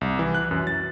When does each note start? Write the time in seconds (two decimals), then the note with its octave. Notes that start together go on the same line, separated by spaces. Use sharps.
0.01 C2
0.19 E3
0.34 F#6
0.51 F#2
0.67 A6